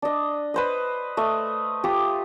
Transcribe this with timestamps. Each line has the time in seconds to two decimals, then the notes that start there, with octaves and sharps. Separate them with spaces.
0.02 D4 D#5
0.54 B4 C5 D#5
1.17 A3 D#5
1.84 F4 G4 C6 D#6